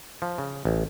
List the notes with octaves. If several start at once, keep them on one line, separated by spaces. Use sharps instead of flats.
F3
C#3
A1